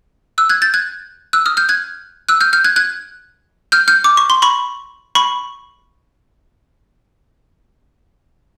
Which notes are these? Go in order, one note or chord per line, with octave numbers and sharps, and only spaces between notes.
E6 F#6
F#6 G#6
G6 A6
F#6 G#6
E6 F#6
D#6 F6
F6 G6
F#6 G#6
E6 F#6
F6 G6
F6 G6
F#6 G#6
F#6 G#6
F6 G6
F6 G6
D6
C#6
C6
B5 C#6
B5 C#6